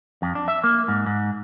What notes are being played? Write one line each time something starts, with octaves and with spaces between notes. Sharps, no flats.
F2
D4
E5
A#3
G#2
G#2